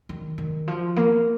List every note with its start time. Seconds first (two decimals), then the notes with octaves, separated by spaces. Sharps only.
0.09 D#3
0.38 D#3
0.68 F3
0.96 A#3